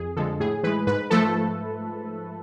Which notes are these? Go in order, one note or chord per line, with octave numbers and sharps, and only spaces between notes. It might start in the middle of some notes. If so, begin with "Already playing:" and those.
Already playing: F2 G#4
D3 F3 G#3 A4
A2 G#4
E3 G#3 B4
G#2 B4
F3 A3 A4